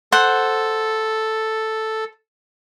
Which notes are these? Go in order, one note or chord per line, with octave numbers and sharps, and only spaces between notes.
A4 C5 F#5